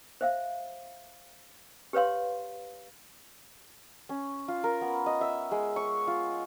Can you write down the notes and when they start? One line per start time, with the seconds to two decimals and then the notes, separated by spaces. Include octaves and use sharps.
0.21 C5 E5 F5
1.93 G4 B4 C#5 F5 C6
4.09 C#4
4.48 F4
4.64 A#4
4.81 B3
5.06 D#5
5.21 E5
5.51 G#3
5.76 C#6
6.08 F4